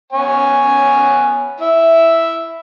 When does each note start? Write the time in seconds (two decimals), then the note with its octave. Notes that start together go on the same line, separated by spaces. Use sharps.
0.13 B3 C#5 G#5
1.60 E4 E5